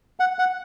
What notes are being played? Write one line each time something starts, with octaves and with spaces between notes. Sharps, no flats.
F#5
F#5